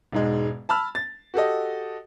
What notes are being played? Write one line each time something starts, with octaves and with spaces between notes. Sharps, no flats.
E1 G#2 G#3
A5 B5 E6 F6
A6
F#4 G4 A4 D#5